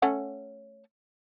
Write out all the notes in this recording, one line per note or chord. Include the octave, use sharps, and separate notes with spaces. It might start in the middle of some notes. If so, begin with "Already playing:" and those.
A3 C#4 F#5